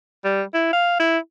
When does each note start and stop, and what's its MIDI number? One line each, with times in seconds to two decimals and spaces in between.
0.25 0.42 55
0.54 0.71 64
0.73 0.99 77
1.00 1.18 64